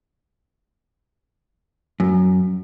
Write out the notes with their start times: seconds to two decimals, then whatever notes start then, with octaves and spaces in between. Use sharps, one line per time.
2.00 F#2